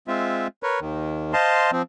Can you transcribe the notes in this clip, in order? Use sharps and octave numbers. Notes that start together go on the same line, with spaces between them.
G#3 C4 F4 E5
A#4 B4 C#5
D#2 D#3
C5 D#5 F5 A5 C6
F3 C4